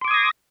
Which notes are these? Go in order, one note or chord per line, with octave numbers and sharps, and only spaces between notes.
C6 D6 D#6 G#6 A#6